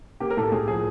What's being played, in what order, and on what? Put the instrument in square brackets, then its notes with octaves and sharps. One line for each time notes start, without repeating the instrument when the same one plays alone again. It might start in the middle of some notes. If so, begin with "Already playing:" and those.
[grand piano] A#3 G4
A#4
A2 A4
A2 G#4
F3 G#4